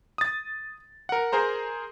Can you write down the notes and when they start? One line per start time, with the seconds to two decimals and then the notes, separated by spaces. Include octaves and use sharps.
0.18 D#6 A6
1.09 A#4 F#5
1.32 G#4 A#4 C5 A#5